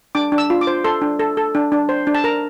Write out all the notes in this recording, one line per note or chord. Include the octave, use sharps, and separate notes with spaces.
D4 D6
D4
E6
F4
D6
C5
A4 C6
D4
A4
A4
D4
D4
C5
D4
A5
A#4 A#5